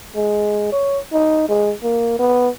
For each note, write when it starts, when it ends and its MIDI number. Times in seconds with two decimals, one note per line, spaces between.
0.16 0.69 56
0.72 0.99 73
1.12 1.47 63
1.49 1.73 56
1.83 2.18 58
2.19 2.49 59